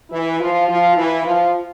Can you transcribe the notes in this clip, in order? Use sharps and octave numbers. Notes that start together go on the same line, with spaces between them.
E3 E4
F3 F4
F3 F4
E3 E4
F3 F4